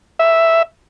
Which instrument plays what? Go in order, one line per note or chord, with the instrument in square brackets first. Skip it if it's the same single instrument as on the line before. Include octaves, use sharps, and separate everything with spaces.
[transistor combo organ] E5